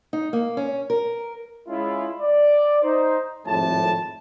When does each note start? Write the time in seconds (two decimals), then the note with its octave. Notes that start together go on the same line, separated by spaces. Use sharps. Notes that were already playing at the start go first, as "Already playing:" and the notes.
0.13 D#4
0.33 A#3
0.57 C#4
0.90 A#4
1.68 G#3 C#4 E4 F4
2.21 D5
2.83 D#4 C5
3.46 G#1 F2 A2 A5